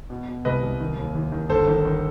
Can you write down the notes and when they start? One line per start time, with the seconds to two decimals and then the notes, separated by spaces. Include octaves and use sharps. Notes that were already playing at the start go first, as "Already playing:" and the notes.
0.10 B2
0.28 B2
0.45 C2 B4 D#5
0.63 C2
0.80 D#3
0.97 D#2
1.15 D#2
1.32 D#3
1.49 G1 A4 C5
1.67 D#3
1.85 D#3